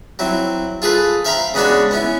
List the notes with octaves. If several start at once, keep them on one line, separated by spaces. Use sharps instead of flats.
F#3 C4 E4
F4 G#4 A4 B4
C5 E5 F5 G5 A#5 B5
C#3 G#3 B3 D4 F#4 C#5
B3 C#4 E4